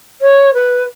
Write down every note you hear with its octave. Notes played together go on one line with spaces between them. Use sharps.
C#5
B4